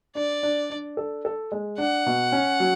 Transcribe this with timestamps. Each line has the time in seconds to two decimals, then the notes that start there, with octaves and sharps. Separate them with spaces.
0.15 D4 D5
0.43 D4
0.70 D4
0.97 A4
1.25 A4
1.52 G#3
1.78 D4 F#5
2.06 B2
2.32 C#4
2.60 F#3